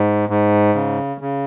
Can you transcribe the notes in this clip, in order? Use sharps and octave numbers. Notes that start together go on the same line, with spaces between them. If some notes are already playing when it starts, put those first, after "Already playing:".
Already playing: G#2
G#2
C#3
C#3